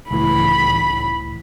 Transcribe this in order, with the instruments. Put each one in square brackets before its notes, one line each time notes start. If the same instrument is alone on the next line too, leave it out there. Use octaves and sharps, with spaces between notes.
[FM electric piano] C#2 A2 E3 [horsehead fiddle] B5